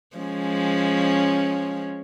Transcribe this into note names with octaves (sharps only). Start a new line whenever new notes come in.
F3 G#3 C#4